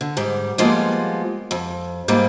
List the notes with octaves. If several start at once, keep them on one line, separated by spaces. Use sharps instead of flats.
D3
G#2 G3
F3 G3 G#3 A#3 B3 F4
F2
G#2 G3 A#3 F4